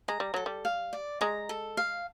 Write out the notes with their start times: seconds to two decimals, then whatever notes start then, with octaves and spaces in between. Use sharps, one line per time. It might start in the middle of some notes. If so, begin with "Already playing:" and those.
0.08 G#3 A#5
0.20 G3
0.34 F#3 A4
0.46 G3
0.65 F5
0.93 D5
1.21 G#3 A#5
1.49 A4
1.77 F5